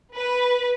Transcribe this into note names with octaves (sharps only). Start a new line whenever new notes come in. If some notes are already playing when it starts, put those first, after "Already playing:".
B4